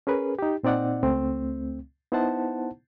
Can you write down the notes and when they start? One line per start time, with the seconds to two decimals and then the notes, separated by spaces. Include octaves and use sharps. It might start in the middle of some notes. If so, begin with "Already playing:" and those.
0.07 C#4 G#4 A#4 B4
0.39 D#4 G4
0.63 A#2 C4 D#4 D5 F#5
1.03 C#2 A3 C4
2.12 B3 D#4 E4 C5 F#5 A5